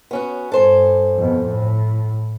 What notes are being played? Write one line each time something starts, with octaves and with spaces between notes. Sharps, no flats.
B3 C#4 F#4
G2 A4 C5 G#5
F2 B2
A2